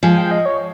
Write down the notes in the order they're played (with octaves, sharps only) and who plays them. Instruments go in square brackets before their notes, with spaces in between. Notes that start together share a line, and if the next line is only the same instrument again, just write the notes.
[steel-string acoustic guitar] F3 G#3 [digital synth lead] G#5
[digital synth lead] G5
D#5
C#5